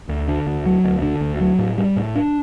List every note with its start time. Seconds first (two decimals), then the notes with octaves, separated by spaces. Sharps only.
0.09 D2
0.28 D3
0.47 D2
0.66 F#3
0.84 D2
1.02 D3
1.21 D2
1.40 F#3
1.59 A2
1.78 G3
1.97 A2
2.15 D4